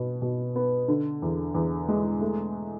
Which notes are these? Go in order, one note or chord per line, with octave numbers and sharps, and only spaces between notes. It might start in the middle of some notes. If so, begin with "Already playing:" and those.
Already playing: B2 B3
B2
B3
D3
E2
E2
G#3
A3